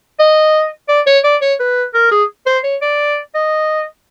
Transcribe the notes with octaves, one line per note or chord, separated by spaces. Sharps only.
D#5
D5
C#5
D5
C#5
B4
A#4
G#4
C5
C#5
D5
D#5